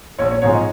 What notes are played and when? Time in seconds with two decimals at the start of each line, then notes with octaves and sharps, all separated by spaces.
0.19 A#1 C#5
0.31 C#5
0.42 G#2 F3 G#3 C#5
0.53 D#5